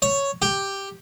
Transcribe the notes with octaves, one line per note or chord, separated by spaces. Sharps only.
C#5
G4